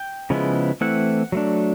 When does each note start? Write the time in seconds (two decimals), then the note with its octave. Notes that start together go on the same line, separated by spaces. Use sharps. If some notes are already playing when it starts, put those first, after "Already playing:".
Already playing: G5
0.30 C#3 F3 G#3 B3 E4
0.81 E3 A3 C4 E4 F#5
1.32 F#3 A3 D4